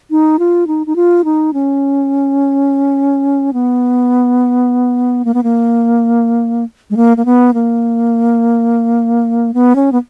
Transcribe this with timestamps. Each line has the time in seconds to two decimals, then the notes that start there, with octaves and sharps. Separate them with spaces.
0.11 D#4
0.39 F4
0.67 D#4
0.87 D#4
0.96 F4
1.25 D#4
1.53 C#4
3.53 B3
5.25 A#3
5.34 B3
5.43 A#3
6.90 G#3
6.97 A#3
7.17 A#3
7.25 B3
7.54 A#3
9.54 B3
9.76 C#4
9.92 B3